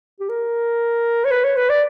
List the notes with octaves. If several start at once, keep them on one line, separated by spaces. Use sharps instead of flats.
G4
A#4
C#5
B4
C#5
B4
D5